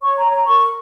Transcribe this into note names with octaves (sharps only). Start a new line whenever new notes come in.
C#5 C#6
A#5
C#5
A#5
A#4 C#6